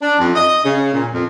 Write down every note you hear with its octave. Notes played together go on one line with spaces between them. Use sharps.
D4
F2
D#5
C#3
A#2
F2